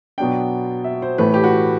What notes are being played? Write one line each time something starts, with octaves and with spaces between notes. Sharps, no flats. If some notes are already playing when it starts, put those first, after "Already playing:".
B2 F#3 B3 D4 G5
E5
C5
A2 E3 A3 B4
G4
F#4